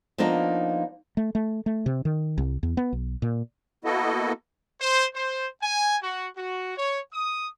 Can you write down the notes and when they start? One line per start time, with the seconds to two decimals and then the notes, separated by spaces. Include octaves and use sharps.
0.18 F3 A#3 B3 D4 D#4 F4
1.17 A3
1.35 A3
1.66 A3
1.86 C3
2.05 D#3
2.38 C2
2.63 E2
2.77 B3
2.93 B1
3.22 A#2
3.85 A#3 B3 E4 F#4 A4 D#5
4.80 C5
5.15 C5
5.62 G#5
6.02 F#4
6.37 F#4
6.77 C#5
7.12 D#6